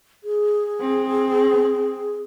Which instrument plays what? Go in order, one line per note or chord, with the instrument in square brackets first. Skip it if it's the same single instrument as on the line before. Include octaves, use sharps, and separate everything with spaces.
[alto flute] G#4
[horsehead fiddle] C4